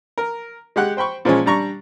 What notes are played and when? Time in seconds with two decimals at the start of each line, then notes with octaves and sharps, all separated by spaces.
0.18 A#4
0.76 G#3 G4 F#5 F#6
0.97 C5 G5 B5 C#6
1.25 A#2 F3 G#3 C#4
1.46 G3 D4 A#5 C#6